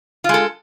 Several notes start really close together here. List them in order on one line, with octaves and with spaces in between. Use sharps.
F4 G#3 A4